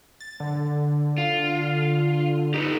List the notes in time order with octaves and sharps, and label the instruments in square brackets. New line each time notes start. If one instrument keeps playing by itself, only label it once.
[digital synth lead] A6
D3
[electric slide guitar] F4
[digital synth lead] D#4 [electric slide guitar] G4 A4 B4